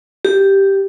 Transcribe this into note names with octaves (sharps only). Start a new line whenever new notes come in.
G4